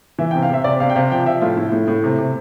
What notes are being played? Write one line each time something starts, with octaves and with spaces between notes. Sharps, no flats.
E3 E5
C3 G5
F5
C3 E5
C3 D5
C3 F5
G5
C3 F5
F3 G5
F3 E5
A2 F4
A2 E4
A2
A2
C3
C3